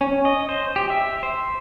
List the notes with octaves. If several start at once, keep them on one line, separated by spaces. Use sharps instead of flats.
C#4
D#5
C5
G4
E5
C5